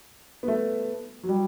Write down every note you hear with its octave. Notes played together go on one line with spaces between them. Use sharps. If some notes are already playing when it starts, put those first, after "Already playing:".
B3
A3
F#3
G3